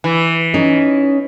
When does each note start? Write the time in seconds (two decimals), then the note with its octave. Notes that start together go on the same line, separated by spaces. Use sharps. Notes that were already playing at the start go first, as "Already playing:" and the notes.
0.04 E3
0.54 C#4 D#4 D#5